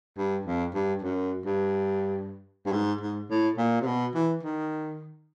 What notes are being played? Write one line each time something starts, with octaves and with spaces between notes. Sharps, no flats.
G2
F2
G2
F#2
G2
G2
G#2
G#2
A2
A#2
C3
B2
E3
D#3